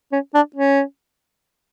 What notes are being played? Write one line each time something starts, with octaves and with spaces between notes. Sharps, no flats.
C#4
D4
C#4